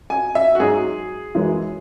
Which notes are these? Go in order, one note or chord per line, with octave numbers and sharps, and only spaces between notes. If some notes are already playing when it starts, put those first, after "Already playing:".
G#5
E5
F#4
G#2 F#3 G#4
F#2 E3 G#3